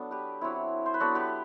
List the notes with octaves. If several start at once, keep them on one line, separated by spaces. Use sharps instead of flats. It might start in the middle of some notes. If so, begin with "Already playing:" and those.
Already playing: F#3 B3 D4 A4
G4 B4
F#3 C4 E4
C5
B4
F#3 B3 D4 F#4 A4
G4 B4